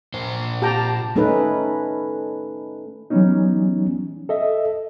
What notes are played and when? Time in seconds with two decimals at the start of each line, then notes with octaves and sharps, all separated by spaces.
0.14 A#2 C5
0.62 G4 G5 A5 A#5
1.16 A3 C#4 D#4 A4 B4
3.10 E3 F#3 G3 B3 C#4 D#4
4.29 A4 D#5 E5